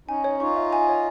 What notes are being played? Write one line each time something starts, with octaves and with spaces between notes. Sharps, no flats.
C#4 D#4 G#5
C#5
D#4 F4 C#6
E5
G#5
C#5